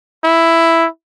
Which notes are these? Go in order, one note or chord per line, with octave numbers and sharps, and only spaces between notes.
E4